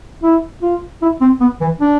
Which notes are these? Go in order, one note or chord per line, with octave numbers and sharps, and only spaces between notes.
E4
F4
E4
C4
B3
E3
D4